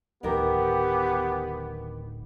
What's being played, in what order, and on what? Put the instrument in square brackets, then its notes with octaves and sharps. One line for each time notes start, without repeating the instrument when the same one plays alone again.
[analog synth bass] D1 [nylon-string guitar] D#3 A4 A#4 [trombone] B3 [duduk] G4